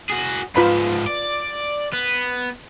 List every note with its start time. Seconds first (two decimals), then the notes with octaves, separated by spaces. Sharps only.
0.10 F#4 G#4
0.56 G#2 F3 F4 B4 B5
1.06 D5
1.93 B3